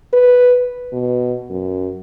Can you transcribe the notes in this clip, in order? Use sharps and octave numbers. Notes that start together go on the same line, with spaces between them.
B4
B2
F#2